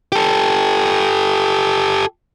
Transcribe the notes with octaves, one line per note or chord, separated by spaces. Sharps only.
G4 A4